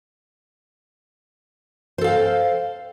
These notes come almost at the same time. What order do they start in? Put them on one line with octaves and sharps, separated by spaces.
C5 A4 F5 G5